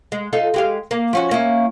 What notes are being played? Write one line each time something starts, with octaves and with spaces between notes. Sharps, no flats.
G#3
D#4 F4 A4
G#3 G4 F5
A#3
F3 C#4 F#4
A#3 C#4 E4